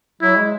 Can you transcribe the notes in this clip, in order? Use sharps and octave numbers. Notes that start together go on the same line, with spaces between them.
F#3 E4
G#3